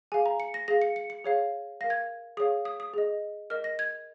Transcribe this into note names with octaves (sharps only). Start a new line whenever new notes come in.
G#4 F5 G#5
A#5
C#7
A#6
G#4 F5 A#6
C#7
C#7
C#7
G#4 C#5 F5
A#4 F5 A#6
G#6
G#4 C#5 F5 D#6
D#6
D#6
G#4 D#5
A#4 D#5 F6
A#6
G#6